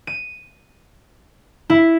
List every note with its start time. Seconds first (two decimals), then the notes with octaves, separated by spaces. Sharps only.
0.07 D#7
1.70 E4